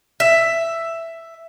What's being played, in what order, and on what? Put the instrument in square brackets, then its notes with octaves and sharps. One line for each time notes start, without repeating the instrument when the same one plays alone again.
[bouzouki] E5